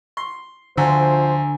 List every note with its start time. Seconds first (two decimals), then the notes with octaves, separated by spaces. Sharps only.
0.17 C6
0.77 D2 D3 F3 C5 G#5 A#5 E6